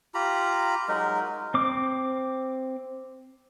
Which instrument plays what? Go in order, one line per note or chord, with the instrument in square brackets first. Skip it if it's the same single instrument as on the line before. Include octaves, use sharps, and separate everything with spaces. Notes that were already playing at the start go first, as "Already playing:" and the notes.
[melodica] F4 G4 A#5 B5
F#3 G#3 D#4 A#4
[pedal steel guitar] C4 D6